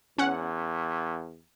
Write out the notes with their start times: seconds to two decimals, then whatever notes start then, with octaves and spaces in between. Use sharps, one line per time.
0.18 E2 C#4 F#5